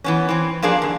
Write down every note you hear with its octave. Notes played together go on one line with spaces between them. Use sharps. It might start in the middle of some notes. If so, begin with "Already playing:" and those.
E3 B3 C#4
E3 C4
F3 G3 A#3 D4 G#4
F#2 D3